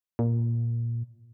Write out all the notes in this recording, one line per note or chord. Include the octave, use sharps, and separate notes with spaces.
A#2